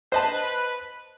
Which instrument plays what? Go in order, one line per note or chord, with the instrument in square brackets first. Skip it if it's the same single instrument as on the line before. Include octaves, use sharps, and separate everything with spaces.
[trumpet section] B4 [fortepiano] C5 D#5 A5